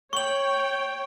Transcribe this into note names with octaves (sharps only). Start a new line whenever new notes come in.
C#5 G5 C#6 F#7